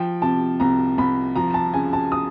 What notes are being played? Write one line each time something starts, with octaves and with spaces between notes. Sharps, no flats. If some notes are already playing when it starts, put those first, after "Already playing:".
Already playing: F3 G5
C3 A5
C2 A#5
C2 B5
F3 A#5
A5
C#3 G#5
A5
D#6